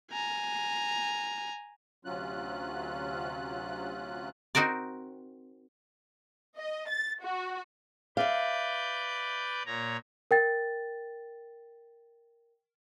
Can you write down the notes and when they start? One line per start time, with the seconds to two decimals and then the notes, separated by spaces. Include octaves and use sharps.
0.11 G#5 A#5
2.05 D2 C3 F#3 C#4 F4 F#6
4.55 C4 D#4 F#4 A#4 D5
6.57 D#5
6.89 A6
7.22 F#4
8.17 B4 D5 E5 F5 G6
9.66 A#2 C#5 A#5
10.31 A#4 G5 A6